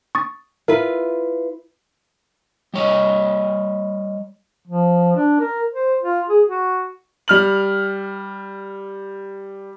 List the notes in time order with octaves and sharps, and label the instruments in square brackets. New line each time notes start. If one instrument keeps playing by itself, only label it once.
[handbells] C#6 D#6 A6
[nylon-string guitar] E4 F4 B4 [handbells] A#4
[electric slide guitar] G3 C#5 D#5
[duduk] F3
D4
A#4
C5
F4
G#4
F#4
[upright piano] G3 F6 F#7